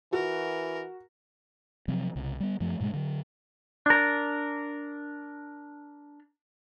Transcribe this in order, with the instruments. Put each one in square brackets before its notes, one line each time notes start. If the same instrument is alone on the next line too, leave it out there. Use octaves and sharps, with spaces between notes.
[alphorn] E3 [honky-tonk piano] F#4 [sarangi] A#4
[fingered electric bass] C3 F3 F#3 C4
C2 C#3
G3 B3
F#2 F3 A3
G#2 B2 F#3 G#3
D3 F#3
[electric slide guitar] D4 A#4